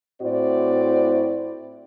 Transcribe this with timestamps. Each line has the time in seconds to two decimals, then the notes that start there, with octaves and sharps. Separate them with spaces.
0.22 A2 C4 E4 F#4 C5 D5